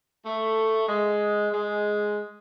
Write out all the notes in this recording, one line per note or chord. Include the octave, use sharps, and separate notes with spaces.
A3
G#3
G#3